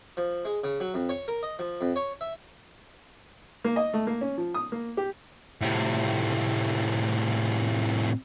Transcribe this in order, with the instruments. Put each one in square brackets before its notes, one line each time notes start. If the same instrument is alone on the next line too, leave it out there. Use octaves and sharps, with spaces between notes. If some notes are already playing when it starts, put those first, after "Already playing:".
[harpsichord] F3
G#3
C#3
F#3
F2
C#5
A#4
D#5
F3
F2
C#5
E5
[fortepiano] A#3
D#5
A3
A#3
C#4
F3
D#6
A#3
G4
[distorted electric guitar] A2 C3